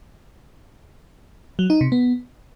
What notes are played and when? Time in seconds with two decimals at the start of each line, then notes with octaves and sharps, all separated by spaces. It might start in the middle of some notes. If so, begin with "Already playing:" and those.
1.59 F#3
1.70 D#4
1.81 C3
1.92 B3